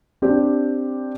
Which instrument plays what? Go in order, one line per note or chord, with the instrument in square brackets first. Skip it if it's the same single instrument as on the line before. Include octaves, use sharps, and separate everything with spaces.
[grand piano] C4 D4 G4